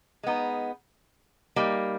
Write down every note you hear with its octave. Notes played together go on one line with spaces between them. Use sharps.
G#3 B3 D#4
G3 A#3 D#4